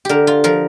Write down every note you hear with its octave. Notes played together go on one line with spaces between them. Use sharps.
D3 G4 A#4
F4
F3 A#4